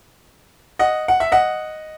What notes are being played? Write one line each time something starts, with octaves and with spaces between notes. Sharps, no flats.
D#5 F#5
F#5
E5
D#5 F#5